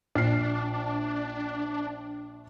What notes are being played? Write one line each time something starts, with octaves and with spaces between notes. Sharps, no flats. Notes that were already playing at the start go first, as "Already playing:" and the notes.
A#1 D4 F6 C7